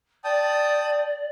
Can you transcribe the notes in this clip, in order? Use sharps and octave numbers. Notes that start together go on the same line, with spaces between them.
D5 G5 A5 D#6